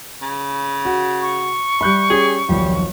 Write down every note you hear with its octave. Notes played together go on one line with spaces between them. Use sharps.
C#3
F#4
C#6
G3 E5 B5 F#6 G6
C#4 G4 G#4
D#1 B1 F3 G3